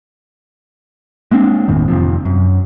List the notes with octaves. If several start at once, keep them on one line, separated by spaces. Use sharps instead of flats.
G#3 A#3 C4 D4
G1 E2 A2 D#3
F2 C3 F3
F#2